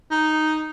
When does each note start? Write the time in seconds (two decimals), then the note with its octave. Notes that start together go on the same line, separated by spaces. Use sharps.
0.10 D#4